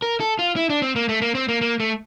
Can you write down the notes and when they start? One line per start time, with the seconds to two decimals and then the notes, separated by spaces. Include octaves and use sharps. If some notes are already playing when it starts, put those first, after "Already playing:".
0.02 A#4
0.20 A4
0.39 F4
0.56 E4
0.70 D4
0.82 C4
0.96 A#3
1.09 A3
1.22 A#3
1.35 C4
1.49 A#3
1.61 A#3
1.80 A3